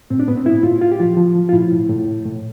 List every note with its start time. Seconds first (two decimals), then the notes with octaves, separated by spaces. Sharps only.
0.10 A2 C4
0.20 D4
0.28 A2 B3
0.37 C4
0.45 A2 E4
0.63 A2 F4
0.81 A2 F4
0.92 G4
1.00 F3 F4
1.17 F3
1.35 F3
1.49 F4
1.53 A2 E4
1.72 A2
1.89 A2
2.07 A2
2.25 A2